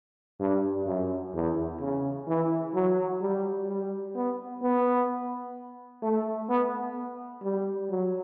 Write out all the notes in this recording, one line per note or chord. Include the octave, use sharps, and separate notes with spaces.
G2
F#2
E2
C#3
E3
F#3
G3
G3
B3
B3
A3
B3
G3
F#3